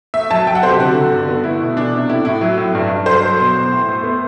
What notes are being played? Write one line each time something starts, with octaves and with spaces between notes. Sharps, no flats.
A3 E5
F#3 A5
F#3 G5
F#5
C3 C5
G4
D3 F#4
D3
G2
B3
A3 E4
B2
E3 D4
C3
A2 E4
A2 E4
F#3
A2
G2
G2
F#3 C5
F#3
B2
E2
A2
A3
B3